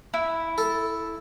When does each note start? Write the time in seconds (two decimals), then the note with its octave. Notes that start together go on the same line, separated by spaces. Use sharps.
0.14 E4
0.58 A4